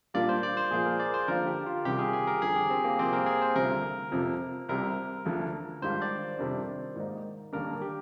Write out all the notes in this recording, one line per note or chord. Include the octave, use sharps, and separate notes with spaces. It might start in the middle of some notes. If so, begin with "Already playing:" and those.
A#2 G3 A#3 D4 F4 D5
C5
D5
C5
A#2 F3 A#3 F4 G#4
A#4
D5
C5
D3 F3 A#3 F4 A#4
G4
F4
C2 C3 D#3 G3 G4
G#4
G#4
A#4
F2 D3 G3 G#4
G4
C4
A#3
C2 C3 F3 C4
A#4
G#4
C5
D2 C3 G3 C4 F4 A#4
F2 C3 F3
C2 C3 G3 A#4
D2 D3 F3
G#2 D#3 G3 D4 F4 C5
D5
F2 C3 D#3 G3 D4
G#2 D#3 A#3 D#4
D#2 D3 G3 A#3 D4 A#4
G4